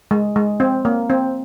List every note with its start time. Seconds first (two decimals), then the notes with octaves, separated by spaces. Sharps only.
0.11 G#3
0.36 G#3
0.60 C4
0.85 A#3
1.10 C4